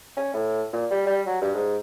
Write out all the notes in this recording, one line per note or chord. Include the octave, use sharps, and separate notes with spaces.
C#4
A2
A#2
G3
G3
F#3
G2
G#2